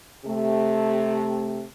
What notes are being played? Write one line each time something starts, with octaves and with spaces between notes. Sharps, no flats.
C3 A3